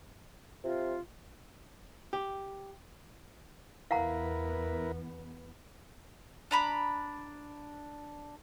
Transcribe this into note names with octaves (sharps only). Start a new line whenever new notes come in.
C3 F4
G4
E2 B3 E4 A#4 B4 F5 F#5 A#5
D4 A#5 B5